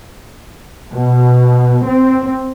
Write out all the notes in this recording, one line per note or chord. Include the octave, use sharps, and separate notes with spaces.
B2
C4